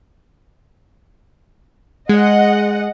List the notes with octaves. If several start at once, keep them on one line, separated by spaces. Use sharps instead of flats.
G#3 D#5 F#5